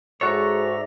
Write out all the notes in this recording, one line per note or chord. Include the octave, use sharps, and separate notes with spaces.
G#2 F#4 A4 C#5 D5 E5 A#5